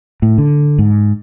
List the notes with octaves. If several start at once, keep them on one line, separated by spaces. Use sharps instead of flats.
A2
D3
G#2